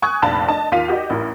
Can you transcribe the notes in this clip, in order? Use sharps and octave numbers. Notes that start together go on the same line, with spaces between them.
G#5 C#6 D#6 F#6 G#6
F1 A#1 F5 A5 B5
D4 D#5 A5
D#2 F4 F5 B6 D#7 F7
F#4 G4 D5 D#5
A1 E4 A#4